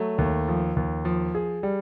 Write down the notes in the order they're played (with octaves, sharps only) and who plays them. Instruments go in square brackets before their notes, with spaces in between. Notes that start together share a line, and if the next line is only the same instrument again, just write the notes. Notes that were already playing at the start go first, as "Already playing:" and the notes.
Already playing: [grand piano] F#3 A3
D#2
F3
D#2
F3
G#4
G3